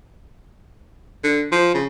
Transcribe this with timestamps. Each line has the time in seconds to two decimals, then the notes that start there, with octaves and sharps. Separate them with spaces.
1.23 D3
1.52 F3
1.74 C#3